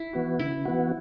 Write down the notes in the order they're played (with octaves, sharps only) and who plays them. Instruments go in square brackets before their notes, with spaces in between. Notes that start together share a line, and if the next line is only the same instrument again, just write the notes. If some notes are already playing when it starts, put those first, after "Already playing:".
Already playing: [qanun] E4
[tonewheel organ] E3 B3 F#4
[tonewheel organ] C#3 [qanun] E4
[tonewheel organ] E3 B3 F#4